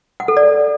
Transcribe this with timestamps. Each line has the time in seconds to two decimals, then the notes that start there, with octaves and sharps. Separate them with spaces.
0.20 F#5
0.28 A4
0.37 D5